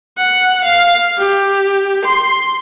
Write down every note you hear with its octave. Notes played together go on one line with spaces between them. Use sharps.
F#5
F5
G4
C6